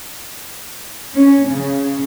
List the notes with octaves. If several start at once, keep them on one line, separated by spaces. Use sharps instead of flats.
C#4
C#3